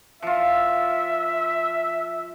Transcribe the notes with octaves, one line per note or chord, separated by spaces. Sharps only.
F3 F4 E5